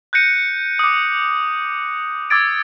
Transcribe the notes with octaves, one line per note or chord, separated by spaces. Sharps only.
F#6 G6 A#6 C#7 D#7
D6 D#6
D6 E6 G#6 A6 D7